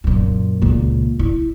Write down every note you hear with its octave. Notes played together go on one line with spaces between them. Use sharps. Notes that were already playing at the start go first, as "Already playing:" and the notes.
F#2 A#2
C#2 A#2
E4